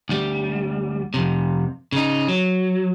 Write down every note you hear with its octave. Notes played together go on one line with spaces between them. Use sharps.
D2 G3
F2 C3
C#3 D#4
F#3